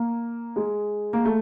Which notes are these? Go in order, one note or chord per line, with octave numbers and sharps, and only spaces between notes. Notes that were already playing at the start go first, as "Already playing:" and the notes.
Already playing: A#3
G#3
A#3
A3